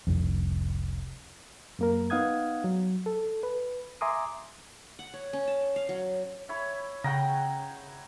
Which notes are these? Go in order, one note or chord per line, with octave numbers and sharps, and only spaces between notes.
F1 C2 F2
F#2 A#3 A#4
B3 D#4 F5 F#5 D#6 G#6
F#3
A4
B4
E5 G#5 A#5 C6 D6 D#6
F#5
C#5
C#4
A5
F5
F#3
E4 C#5 B5
C#3 F#5 G5 A#5